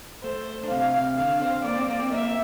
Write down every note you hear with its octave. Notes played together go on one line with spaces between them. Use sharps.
A3 C5
D4
C3 C4 F5
D3 D4 F5
C4 C5
A#3 A#4 D5
C4 C5
A#3 A#4
C4 C5
A#3 A#4 E5